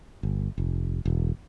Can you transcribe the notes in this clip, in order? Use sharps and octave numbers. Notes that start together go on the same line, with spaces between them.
G1
F1
E1